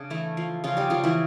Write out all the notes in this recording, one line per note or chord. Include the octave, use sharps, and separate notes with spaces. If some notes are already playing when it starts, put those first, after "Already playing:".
Already playing: C#3 D4
E3 A3 E4
F3
C#3 F3 F4
G3 G4
C#3 F3 F4
E3 E4